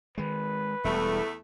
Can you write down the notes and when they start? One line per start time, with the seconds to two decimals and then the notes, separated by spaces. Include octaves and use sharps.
0.18 D#3 G#3 B4
0.84 E1 E2 G3 A3